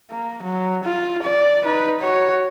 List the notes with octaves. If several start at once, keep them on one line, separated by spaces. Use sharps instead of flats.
A#3
F#3
F4
D5
D#4 B4
F#4 C#5